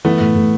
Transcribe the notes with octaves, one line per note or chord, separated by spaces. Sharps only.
E3 A3 B3
A2
A2